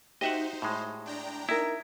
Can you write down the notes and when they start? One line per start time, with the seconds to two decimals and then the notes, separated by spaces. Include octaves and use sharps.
0.21 D#4 F#4 G4 C5 D#5 E5 F#5
0.62 A2 G#3
1.06 D4 G5 A#5
1.49 D#4 E4 A#4